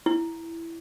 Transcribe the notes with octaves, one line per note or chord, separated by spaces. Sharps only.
E4